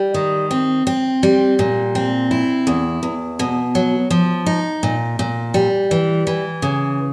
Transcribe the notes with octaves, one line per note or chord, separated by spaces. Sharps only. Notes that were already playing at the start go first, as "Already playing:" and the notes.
Already playing: G3
D#3
C4
C4
G3
A#2
C4
E4
E2
E2
B2
F#3
F3
D#4
A#2
A#2
G3
E3
E3
C#3